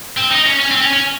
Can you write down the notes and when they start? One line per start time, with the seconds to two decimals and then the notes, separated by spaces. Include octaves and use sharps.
0.17 C4
0.31 D#4
0.46 C#4
0.60 C#4
0.71 C4
0.81 C#4
0.93 C#4